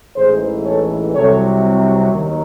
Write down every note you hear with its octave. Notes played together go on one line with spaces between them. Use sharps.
A1 G#2 E3 G#4 C5
A4 C#5
C2 C3 F#3 A4 C#5
D#2 D#3 F#3